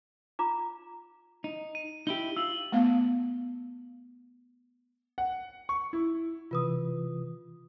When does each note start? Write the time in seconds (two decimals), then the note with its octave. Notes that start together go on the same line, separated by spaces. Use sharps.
0.39 F4 A#5 D6
1.44 D#4
1.75 D#7
2.07 D#4 E4 G4 G7
2.36 F4 E6 F#7
2.72 A3 B3 F5
5.18 F#5
5.69 C#6
5.93 E4
6.51 C3 E3 F4 B4 D#6